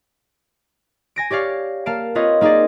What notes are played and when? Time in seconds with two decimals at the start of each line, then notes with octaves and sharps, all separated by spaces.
1.16 G#5 A#6 D7
1.31 G4 C#5 D5 F5
1.86 A#3 F5 A5 D7
2.15 C4 F4 B4 C#5 D#5
2.41 A#3 D#4 G#4 C5 D5